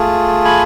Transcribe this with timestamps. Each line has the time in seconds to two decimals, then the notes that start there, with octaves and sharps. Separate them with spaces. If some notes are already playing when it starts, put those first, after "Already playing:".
Already playing: A3 F4 G#4
0.45 G#5 B5